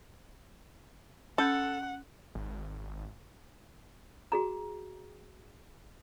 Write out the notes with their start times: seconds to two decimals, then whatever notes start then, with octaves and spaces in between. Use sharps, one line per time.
1.38 C#4 A4 F#5 F6 G6
2.35 G#1
4.32 F#4 G#4 A#5